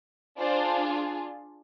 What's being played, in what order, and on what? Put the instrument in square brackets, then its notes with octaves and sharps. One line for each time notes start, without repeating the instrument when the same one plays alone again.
[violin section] D4 F4 G#4 C5 D5